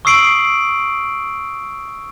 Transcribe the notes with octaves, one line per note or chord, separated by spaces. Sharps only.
C#6 D#6 E6 C7 D7 F#7